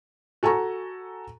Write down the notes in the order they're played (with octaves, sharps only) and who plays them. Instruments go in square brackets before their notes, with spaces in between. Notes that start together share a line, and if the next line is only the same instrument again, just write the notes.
[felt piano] F#4 A4 G#5 A#5 C#6